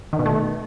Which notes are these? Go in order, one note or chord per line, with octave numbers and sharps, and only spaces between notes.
D#3
B2
A3